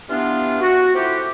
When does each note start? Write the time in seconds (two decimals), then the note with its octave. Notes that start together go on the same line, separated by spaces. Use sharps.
0.09 E3 G3 B3 D4 F4
0.60 F#4
0.95 A3 C4 E4 F4 G4